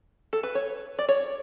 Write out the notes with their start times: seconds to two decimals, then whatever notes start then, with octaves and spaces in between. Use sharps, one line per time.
0.33 A4
0.43 B4
0.55 C#5
0.99 D5
1.09 C#5